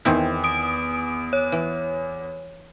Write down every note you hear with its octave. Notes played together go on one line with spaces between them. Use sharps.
E2 D#3 C4 E4
D#6 D7
C#5
E3